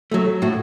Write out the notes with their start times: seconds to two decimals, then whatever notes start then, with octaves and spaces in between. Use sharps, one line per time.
0.11 F#3 A3
0.42 A2 F#4